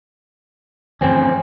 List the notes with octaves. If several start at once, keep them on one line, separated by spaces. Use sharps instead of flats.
D2 G2 E3 F3 C4 C#4